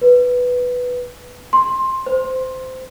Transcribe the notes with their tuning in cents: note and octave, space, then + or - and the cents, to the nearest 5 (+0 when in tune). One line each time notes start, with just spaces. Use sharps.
B4 +0
C6 +15
C5 -20